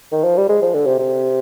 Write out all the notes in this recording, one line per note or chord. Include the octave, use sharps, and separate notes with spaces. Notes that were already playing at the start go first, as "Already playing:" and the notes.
D#3
F3
G3
G#3
F3
D3
C3
C3